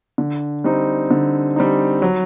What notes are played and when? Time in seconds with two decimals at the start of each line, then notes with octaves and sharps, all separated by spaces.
0.18 D3
0.64 G3 C4 D#4
1.11 D3
1.56 G3 C4 D#4
2.02 F#3